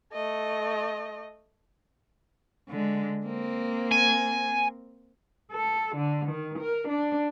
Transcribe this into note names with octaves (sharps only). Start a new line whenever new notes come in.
A3 D#5
D3 G#3
A#3 C4
G#5
A4
D3
D#3
A#4
D4